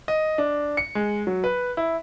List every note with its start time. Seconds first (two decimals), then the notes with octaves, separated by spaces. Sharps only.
0.08 D#5
0.38 D4
0.77 C#7
0.95 G#3
1.27 F#3
1.44 B4
1.77 E4